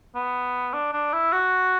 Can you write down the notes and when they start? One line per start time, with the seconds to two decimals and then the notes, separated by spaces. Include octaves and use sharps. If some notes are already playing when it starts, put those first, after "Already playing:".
0.15 B3
0.73 D4
0.93 D4
1.13 E4
1.32 F#4